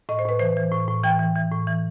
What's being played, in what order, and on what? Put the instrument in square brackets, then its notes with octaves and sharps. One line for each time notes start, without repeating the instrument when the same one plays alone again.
[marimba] A2 D#5
C5
A2 B4
E3 C5
E3
A2
A2
E3 G5
E3
E3
A2
E3